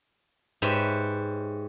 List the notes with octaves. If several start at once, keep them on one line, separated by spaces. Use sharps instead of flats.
G#2 G4 B4 C#5 E5